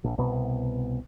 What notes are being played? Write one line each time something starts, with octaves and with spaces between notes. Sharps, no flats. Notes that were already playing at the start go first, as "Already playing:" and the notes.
A#1
C2 B2 B3